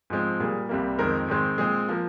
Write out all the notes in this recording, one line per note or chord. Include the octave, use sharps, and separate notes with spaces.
G#2 F3 G#3 C4
A#2 G3 A#3 G#4
C2 C3 G3 A#3
F2 D#3 G#3 C4 A#4
G#2 D#3 G#3 C4
A#2 G#3 C4 G#4
F3 A#3